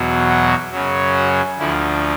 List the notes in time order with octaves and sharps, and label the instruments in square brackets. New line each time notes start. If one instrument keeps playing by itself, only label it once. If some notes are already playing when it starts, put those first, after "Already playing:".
Already playing: [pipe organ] E2 B2 F#3
F#4
F#2 C#3 F#3
F#4
D2 D3 F3 E4